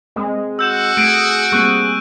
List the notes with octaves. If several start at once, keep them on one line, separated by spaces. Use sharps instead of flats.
G#3 C4 A#4
F#4 E6 G6 E7
A3 G#4 D7
G3 A#3 C4 G#4 C#6 F#6